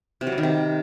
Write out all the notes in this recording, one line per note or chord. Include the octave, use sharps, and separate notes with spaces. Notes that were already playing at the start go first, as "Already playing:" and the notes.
C3
F#3
G3
D#3
C3